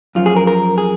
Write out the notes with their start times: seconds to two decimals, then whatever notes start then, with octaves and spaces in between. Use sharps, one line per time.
0.15 F#2 F3 F4
0.26 G#4
0.36 A#4
0.47 A#4
0.78 G#4